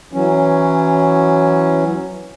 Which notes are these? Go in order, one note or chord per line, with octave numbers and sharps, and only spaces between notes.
E3 F#3 C#4